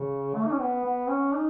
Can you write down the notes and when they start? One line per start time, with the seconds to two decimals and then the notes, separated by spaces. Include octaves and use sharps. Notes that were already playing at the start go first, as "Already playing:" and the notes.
Already playing: C#3
0.35 A3
0.44 D#4
0.51 C#4
0.59 B3
0.84 B3
1.09 C#4
1.34 D#4